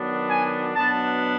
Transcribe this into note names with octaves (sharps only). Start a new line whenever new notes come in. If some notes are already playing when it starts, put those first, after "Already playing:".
Already playing: D#3 F#3 B3 D4
G#5
B2 F#3 B3 D4 A5